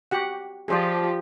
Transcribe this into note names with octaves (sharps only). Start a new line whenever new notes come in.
F#4 G4 F#5
F3 G4 G#4 C5 D5